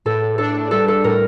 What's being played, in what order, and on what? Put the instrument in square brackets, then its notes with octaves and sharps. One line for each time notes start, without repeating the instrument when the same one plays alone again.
[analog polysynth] A2 [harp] A4
[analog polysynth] D4 [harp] A4
[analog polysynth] G3 [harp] A4
[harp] A4
[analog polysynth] A2 [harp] A#4